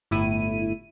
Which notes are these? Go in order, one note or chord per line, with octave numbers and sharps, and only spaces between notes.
G1 A2 E4 D#7